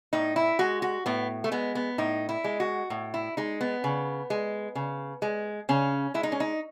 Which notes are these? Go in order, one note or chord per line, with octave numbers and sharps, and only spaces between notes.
A2 D#4
E4
G#3 F#4
F#4
A2 B3
A3
G#3 B3
B3
A2 D#4
E4
G#3
F#4
A2
E4
G#3 D#4
B3
C#3
G#3
C#3
G#3
C#3 C#4
G#3 E4
D#4
C#4
D#4